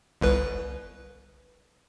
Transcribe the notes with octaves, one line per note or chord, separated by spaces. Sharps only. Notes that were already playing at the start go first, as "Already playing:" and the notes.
G1 C2 B4